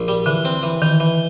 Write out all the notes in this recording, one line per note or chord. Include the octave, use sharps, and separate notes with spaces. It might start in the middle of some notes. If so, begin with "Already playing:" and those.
Already playing: A#1
G3
D3 E3
C4
E3
D#3 E3
E3